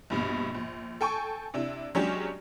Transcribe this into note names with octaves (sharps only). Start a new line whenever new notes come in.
A#1 G2 B2
A#1
A4 G5 G#5 C#6
C3 D4 E4
F#3 G#3 C#4 D4 G4